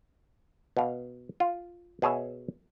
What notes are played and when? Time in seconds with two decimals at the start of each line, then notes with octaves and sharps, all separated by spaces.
0.77 B2 F5
1.40 F4
2.02 B2 G#4 C#5 E5